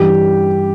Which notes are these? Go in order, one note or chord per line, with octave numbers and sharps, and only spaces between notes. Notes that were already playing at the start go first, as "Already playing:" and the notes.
Already playing: G2 E3 G4